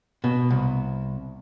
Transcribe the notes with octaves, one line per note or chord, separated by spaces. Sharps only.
B2
C2